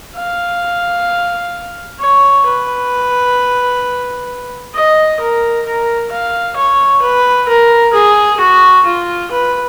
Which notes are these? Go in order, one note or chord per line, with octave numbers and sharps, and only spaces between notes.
F5
C#5
B4
D#5
A#4
A#4
F5
C#5
B4
A#4
G#4
F#4
F4
B4